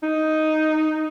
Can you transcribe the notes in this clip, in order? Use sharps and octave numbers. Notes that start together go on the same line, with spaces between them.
D#4